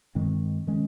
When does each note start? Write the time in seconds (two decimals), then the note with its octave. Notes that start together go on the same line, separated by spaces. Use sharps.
0.15 G2 D#3 G#3 C4
0.67 D#3 G#3 C#4